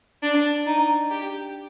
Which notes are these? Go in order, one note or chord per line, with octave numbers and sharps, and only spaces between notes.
D4
D#4
G4